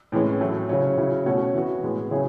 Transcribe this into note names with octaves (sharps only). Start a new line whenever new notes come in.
A2 E3 G#3 C#4
A2 F#3 A3
C#3 F#3 C#4
C#3 F#3 C#4 E4
B2 A3 C#4 F#4
E3 B3 F#4
A2 G#3 B3
C#3 F#3 C#4 E4 G#4